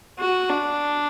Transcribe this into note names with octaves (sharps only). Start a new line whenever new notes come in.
F#4
D4